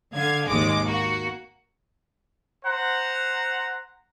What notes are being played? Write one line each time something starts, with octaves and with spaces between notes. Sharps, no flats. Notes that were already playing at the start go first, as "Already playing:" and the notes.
D3 F5 G#6
G#1 D#2 G#3 D6
A#3 F#4
C5 F#5 A#5